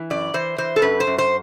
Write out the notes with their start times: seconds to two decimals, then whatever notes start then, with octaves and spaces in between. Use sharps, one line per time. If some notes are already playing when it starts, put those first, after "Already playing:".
Already playing: E3
0.10 F#2 D5
0.34 E3 C5
0.58 E3 C5
0.76 A4
0.82 F#2 B4
1.00 C5
1.07 F#2
1.18 C5